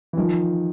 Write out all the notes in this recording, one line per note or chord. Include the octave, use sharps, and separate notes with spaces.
E3
D#3 F3